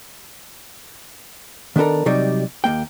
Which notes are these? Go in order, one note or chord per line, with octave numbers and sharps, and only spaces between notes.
D#3 B3 D4 A4 A#4
C3 F#3 G3 D#4 D5
D#2 A#3 G5